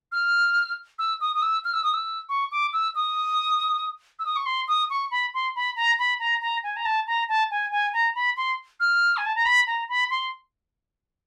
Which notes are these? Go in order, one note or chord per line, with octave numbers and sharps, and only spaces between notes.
F6
E6
D#6
D#6
E6
F6
E6
D#6
E6
C#6
D6
E6
D#6
E6
D#6
C#6
C6
D#6
C#6
B5
C6
B5
A#5
B5
A#5
A#5
G#5
A#5
A5
A#5
A5
G#5
G#5
A#5
B5
C6
F6
G#5
A5
A#5
B5
A#5
B5
C6